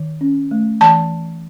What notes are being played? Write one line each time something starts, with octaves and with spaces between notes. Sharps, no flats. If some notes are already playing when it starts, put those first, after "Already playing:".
Already playing: D#3
C#4
A3
E3 A5